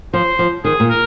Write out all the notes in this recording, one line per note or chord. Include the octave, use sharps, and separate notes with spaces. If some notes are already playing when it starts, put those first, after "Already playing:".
F3 C5
F3
D#3 G#4
A#2
A#4